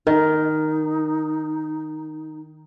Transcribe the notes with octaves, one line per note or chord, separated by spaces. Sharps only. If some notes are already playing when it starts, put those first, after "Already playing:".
D#3 D#4 A#4